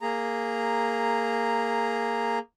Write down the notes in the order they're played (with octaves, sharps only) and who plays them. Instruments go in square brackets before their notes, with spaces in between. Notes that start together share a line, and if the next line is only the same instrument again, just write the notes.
[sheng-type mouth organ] A#3 G#4 A#5